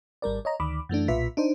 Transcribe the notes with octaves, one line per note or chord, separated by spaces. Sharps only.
G#1 G3 A#4 D5
C#5 D#5 A#5
D2 D#3 B5 D6
F#2 E3 A3 D4
B1 A#2 F4 B4 E5 B6
D4 D#4 C5